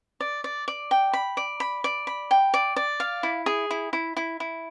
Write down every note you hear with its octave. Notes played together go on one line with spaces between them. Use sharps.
D5
D5
D5
G5
B5
D5
B5
D5
B5
G5
D5
D5
F5
E4
G#4
E4
E4
E4
E4